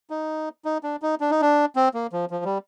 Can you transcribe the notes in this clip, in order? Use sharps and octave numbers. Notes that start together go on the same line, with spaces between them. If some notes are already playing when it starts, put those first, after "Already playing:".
D#4
D#4
D4
D#4
D4
D#4
D4
C4
A#3
F3
F3
G3